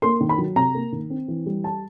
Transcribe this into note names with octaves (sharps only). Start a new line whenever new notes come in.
A#3 C6
D#3
B5
F#3
C3 A#5
A#3
D#3
C4
E3
G3
A5